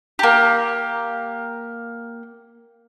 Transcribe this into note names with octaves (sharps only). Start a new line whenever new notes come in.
A#3 G4